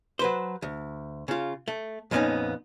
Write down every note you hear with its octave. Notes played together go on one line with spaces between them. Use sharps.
F#3 B4 C5
D2
C#3 F4
A3
F2 A#2 G#3 B3 C#4 D#4